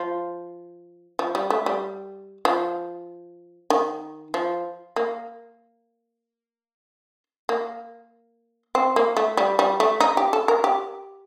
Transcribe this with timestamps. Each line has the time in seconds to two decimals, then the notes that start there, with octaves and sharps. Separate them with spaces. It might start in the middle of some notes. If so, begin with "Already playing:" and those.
Already playing: F3
1.19 F3
1.35 G3
1.50 A3
1.66 G3
2.45 F3
3.70 D#3
4.34 F3
4.96 A#3
7.49 A#3
8.75 C4
8.96 A#3
9.16 A3
9.37 G3
9.59 G3
9.80 A3
10.00 D#4
10.17 G4
10.33 A4
10.48 A#4
10.64 G4